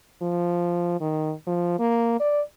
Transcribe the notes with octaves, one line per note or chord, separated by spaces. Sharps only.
F3
D#3
F3
A#3
D5